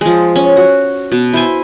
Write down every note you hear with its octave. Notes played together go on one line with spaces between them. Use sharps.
F3 G#3
C#4
F#4
B2
E4 C5 G#5